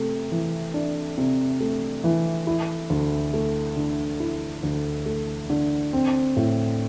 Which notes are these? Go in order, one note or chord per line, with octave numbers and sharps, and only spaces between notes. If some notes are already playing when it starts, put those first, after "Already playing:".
Already playing: C3 A3
E3
D4
C3
A3
E3
E4
D2
A3
D3
E4
D2
A3
D3
C4
A2